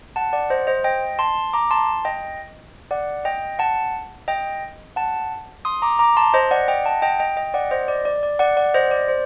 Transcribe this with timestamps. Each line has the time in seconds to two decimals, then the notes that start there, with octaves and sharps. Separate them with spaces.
0.16 F#5 A5
0.33 D5 F#5
0.50 C5 D#5
0.67 C5 D#5
0.84 D#5 G5
1.19 A5 C6
1.53 A#5 D6
1.71 A5 C6
2.05 D#5 G5
2.91 D5 F#5
3.25 D#5 G5
3.59 F#5 A5
4.28 D#5 G5
4.96 F#5 A5
5.65 C6 D#6
5.82 A#5 D6
5.99 A#5 D6
6.17 A5 C6
6.34 C5 D#5
6.51 D5 F#5
6.68 D#5 G5
6.85 F#5 A5
7.02 D#5 G5
7.19 D#5 G5
7.37 D#5 G5
7.54 D5 F#5
7.71 C5 D#5
7.88 D5
8.05 D5
8.23 D5
8.39 D5 F#5
8.57 D5 F#5
8.74 C5 D#5
8.91 D5
9.08 C5